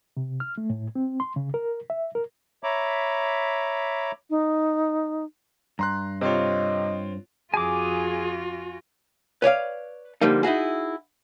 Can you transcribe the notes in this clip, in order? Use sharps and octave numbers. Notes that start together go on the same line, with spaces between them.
C3
F6
A3
A2
C4
C6
C#3
A#4
E5
A#4
C#5 E5 A#5 B5 D6
D#4
G2 A#5 C6 F#6
C3 C4 F4 C#5 D#5
F2 F4 F#4 G#4 G#5 D6
B4 C#5 D5 F5
D3 F3 G3 A#3 D#4
D#4 E4 F#4 G#4